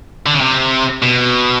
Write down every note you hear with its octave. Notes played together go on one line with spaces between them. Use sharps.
D3
C#3
C3
B2